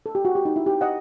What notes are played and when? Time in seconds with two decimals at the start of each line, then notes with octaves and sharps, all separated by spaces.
0.06 A4
0.15 G4
0.25 F#4
0.35 G4
0.45 D#4
0.56 E4
0.66 G4
0.81 D#5 F#5